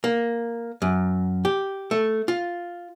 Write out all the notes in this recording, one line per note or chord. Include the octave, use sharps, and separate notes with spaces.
A#3
F#2
G4
A3
F4